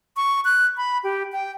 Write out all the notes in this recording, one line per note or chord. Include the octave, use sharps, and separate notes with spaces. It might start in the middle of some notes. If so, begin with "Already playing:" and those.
C#6
F#6
B5
G4
G5